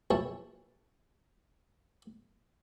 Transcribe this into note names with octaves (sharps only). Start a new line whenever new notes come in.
A#1 B2 E4 C#5 A5